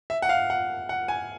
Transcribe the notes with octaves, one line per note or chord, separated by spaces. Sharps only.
E5
F#5
F5
F#5
F#5
G#5